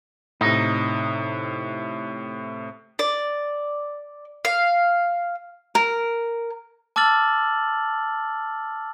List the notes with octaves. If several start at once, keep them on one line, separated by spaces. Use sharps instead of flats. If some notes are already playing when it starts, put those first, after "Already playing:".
A2 C3 D#4
D5
F5
A#4
A5 D6 E6 F6 A6 F#7